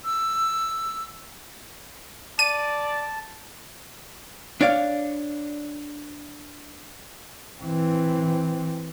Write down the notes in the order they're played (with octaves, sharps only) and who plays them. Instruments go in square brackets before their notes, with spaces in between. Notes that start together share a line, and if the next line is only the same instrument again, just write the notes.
[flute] E6
[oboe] D5 [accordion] A5 [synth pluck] D#7
[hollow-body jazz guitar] D4 C#5 D5 F5
[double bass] E3 C4